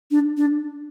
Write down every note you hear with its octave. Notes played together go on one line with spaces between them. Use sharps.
D4
D4